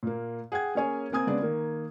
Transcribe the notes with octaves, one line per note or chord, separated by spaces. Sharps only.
A#2 A#3
G#4 F#5 G5 G#6
A#3 C#4 G#4 C#5 G#5
A#3 C4 G#5 D#6 G#6
C#3 G#3 B3 D4 D5
D#3 A#3